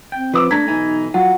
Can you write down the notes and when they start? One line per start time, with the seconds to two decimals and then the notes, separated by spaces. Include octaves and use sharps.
0.12 C4 G5
0.34 F3 B4 D6 E6
0.51 A3 D4 A4 A#5 G#6 B6
0.68 B1 E3 D#4 G#5
1.14 F#3 F4 F#5